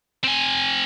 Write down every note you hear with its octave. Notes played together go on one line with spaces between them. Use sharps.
C4 G#5